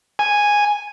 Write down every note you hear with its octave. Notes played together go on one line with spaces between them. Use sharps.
G#5